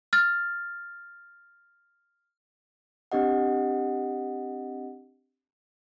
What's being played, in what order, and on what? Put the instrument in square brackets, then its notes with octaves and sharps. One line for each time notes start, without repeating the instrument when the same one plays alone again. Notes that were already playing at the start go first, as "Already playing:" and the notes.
[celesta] F6 A6
[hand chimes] C4 D4 G4 D#5 F#5